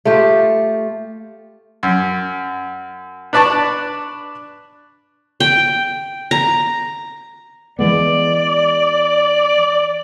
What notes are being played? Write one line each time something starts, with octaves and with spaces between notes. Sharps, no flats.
A3 F4 G4
F#2
D4 B4 D5 A5 C#6
G5
A#5
E3 G#3 B3 D5